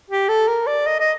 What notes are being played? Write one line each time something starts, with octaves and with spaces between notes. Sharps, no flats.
G4
A4
A#4
D5
D#5
D#5